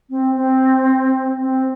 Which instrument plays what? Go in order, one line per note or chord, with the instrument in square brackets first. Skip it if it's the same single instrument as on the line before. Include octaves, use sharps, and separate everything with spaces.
[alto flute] C4
C4
C4